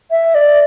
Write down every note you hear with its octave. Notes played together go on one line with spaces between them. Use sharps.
E5
D5